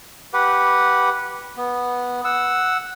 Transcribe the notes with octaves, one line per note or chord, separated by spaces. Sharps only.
G4 B4 F#5
B3
F#5 E6